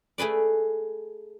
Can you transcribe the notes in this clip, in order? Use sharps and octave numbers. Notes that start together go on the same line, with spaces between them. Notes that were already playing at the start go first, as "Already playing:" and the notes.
A3 G#4 B4 D5